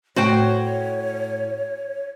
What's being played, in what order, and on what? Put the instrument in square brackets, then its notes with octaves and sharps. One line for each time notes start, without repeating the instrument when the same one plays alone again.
[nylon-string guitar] A2 [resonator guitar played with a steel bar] F#4 C5 G5 [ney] C#5